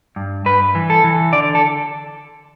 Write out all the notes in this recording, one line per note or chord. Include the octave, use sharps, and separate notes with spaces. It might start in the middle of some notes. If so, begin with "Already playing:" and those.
G2
G2 B4
E3
A4
E3
D3 D5
A4